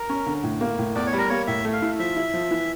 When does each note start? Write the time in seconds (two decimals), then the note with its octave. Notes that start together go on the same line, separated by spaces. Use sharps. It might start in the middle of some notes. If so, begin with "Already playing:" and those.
Already playing: A#4
0.10 C#4
0.26 D3
0.44 A2
0.61 A#3
0.78 A2
0.95 E2 D5
1.06 C#5
1.13 G3
1.18 A#4
1.29 A#3 C#5
1.47 A2 E5
1.65 A3
1.73 F5
1.82 E4
1.99 F3 E5
2.16 E4
2.34 F3
2.51 E3